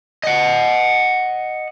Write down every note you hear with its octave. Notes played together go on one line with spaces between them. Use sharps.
D#5 F#5